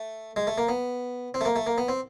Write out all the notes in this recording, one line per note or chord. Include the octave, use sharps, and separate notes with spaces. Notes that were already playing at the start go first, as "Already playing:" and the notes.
Already playing: A3
G#3
A3
A#3
B3
C4
A3
A#3
A3
A#3
B3
C4